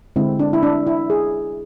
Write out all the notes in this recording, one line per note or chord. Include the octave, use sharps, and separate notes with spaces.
D3 G#3 C4 E4
D4
E4
D4
E4
G#4